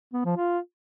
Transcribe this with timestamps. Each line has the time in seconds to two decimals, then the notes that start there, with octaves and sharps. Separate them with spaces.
0.13 B3
0.25 F3
0.37 F4